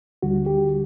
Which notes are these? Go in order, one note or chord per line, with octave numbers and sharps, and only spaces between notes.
D2 D3 G3 F#4
G4